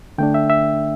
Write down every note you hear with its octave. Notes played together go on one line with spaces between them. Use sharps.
D3 A3 D4 G5
E5
E5